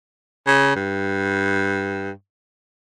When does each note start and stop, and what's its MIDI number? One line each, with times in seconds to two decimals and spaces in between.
0.47 0.73 49
0.76 2.11 43